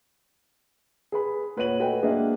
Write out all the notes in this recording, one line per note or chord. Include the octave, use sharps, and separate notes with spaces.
G#4 B4 B5
A#2 B4 C#5 F#5 D#7 F#7
A3 F#4 B4 D#5 G5 G#5
G#3 A#3 D4 D#5 E5